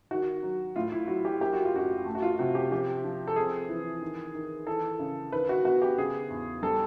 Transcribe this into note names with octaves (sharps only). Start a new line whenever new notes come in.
D#3 F#4
F#3
A2 F4
E4
F#3 F#4
G4
A#3 G4
F#4
F4
F#2 F#4
A3
F#4
F4
C3 F#4
G4
F3 G4
F3
A4
C4 G#4
E3
D#3
D#3
E3 A4
C#3
D#3 B4
F#4
B3 F#4
G4
C#3 G#4
E2
G3 A4